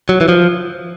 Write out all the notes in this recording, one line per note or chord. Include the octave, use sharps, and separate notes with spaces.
F#3
E3
F3